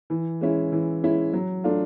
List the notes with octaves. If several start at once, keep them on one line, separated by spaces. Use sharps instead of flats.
E3
G#3 C#4 E4
E3
G#3 C#4 E4
F#3
A3 D4 F4